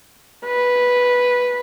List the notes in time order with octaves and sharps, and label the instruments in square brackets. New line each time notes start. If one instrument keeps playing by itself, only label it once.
[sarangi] B4